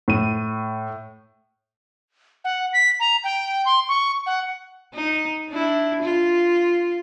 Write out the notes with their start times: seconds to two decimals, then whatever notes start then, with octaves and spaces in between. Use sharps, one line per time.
0.08 A2 D#7
2.45 F#5
2.73 B6
3.00 A#5
3.24 G5
3.66 C6
3.89 C#6
4.26 F#5
4.95 D#4
5.49 D4 E4
6.02 F4